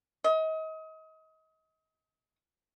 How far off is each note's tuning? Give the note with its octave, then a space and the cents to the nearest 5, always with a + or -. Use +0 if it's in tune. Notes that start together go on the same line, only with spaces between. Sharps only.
D#5 +35